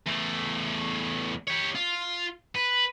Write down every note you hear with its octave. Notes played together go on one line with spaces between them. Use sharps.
E2 A3
G4 C#5
F4
B4